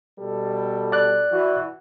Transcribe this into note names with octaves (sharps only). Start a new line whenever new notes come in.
B2 G3 A4
D5 F#6
E3 F#4